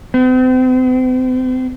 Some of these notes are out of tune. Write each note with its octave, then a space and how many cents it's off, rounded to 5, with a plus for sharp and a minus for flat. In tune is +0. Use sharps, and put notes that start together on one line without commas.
C4 -40